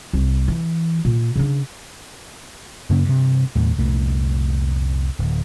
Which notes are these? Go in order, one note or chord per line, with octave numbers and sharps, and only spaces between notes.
C2
E3
A#2
C#3 D4
F#2 C#3 A#3 C#4
G2 C3
D#2 A2
C2 F2 A#2 A3
D1